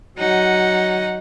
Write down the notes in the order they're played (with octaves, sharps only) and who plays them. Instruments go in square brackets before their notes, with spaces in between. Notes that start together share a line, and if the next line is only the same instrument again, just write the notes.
[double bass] F#3 [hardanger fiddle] D#4 F#5